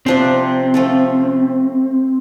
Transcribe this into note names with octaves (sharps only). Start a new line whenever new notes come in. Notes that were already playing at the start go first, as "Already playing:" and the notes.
C3 F3 C4 D4 G4
F3 A3 F4 A4